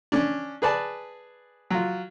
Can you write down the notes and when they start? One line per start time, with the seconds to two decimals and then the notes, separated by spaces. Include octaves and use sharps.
0.12 C#4 D4
0.62 G#4 B4 D5 A5
1.70 F#3 F4